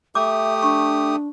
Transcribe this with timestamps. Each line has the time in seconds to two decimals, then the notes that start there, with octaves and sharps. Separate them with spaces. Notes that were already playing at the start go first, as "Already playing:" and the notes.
0.15 A3 G4 E5 D6 D#6
0.63 D4 C#6